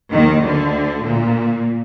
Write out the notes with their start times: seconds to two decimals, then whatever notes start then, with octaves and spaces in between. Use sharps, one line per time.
0.10 D#2 D#3
0.42 D2 D3
1.05 A#2